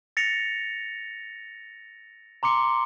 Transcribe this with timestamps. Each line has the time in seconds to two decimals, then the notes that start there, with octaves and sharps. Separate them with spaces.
0.17 A6 A#6 C#7 F7
2.43 A#5 C6 D6 C#7